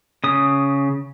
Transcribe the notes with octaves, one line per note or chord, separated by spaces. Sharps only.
C#3 D#6